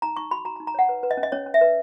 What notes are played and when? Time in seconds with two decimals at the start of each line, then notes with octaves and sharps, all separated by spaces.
0.02 D#4 A#5
0.17 D#4 C#6
0.31 F#4 B5
0.45 F#4 A#5
0.56 A#5
0.60 D#4
0.67 A#5
0.74 C#5 F#5
0.89 B4
1.03 B4
1.11 D#5
1.17 C#4
1.23 D#5
1.32 C#4 C#5
1.46 C#4
1.54 E5
1.61 B4